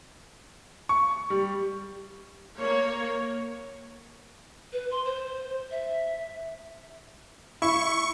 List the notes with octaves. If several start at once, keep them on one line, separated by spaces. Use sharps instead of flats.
C#6
G3
A#3 C#5
B4
C6
C5
E5
E4 C#6